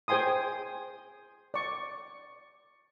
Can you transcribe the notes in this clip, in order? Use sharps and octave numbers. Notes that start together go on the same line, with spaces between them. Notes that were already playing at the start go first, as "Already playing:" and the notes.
G#4 C5 G5 G#5 C6 D#6
D5 C#6